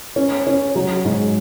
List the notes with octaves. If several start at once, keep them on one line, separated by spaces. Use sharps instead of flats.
C#4
C#4
F#3
G#2